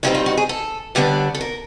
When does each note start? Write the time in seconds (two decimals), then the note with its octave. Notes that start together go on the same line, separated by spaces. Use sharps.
0.03 G2 D#3 G3 C4 D#4 E4
0.15 F4
0.26 F#4
0.37 G#4
0.49 A4
0.95 D#2 D3 G3 B3 D4
1.35 A4
1.41 A#4